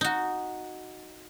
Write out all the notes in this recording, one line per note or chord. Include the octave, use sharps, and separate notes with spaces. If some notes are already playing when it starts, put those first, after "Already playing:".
D#4 F#4